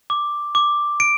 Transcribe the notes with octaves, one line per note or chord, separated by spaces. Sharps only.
D6
D6
D7